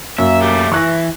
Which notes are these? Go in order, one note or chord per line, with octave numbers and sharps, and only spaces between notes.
F#2 A#3 E5
A3 G4
E3 C#6 F#6 A#6